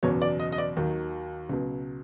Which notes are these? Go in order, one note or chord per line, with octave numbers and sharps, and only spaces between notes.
F#1 E2 B2 F#3 C#5
D5
D#5
D#5
D5
D#2 D#3 F#3
C#2 B2 F#3